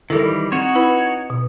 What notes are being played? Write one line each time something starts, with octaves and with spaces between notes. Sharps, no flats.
D#3 E3 G3 E4 A4 A#4
C4 D#4 F#4 C#5
E4 B4 B5
B2